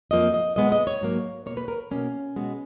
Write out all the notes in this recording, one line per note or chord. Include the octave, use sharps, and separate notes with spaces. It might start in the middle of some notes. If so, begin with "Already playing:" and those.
F2 F3 A#3 D#5
D#5
A#2 G#3 B3 D#5
D#5
C#5
G#2 F#3 A#3
B2 A#3 C#5
B4
A#4
B2 A#3 C#4
B2 G#3 B3